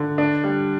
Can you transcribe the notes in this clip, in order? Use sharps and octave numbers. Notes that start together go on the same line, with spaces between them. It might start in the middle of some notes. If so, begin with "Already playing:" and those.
Already playing: D3
D4
G3